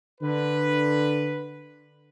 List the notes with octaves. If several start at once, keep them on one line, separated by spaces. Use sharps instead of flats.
D3 B4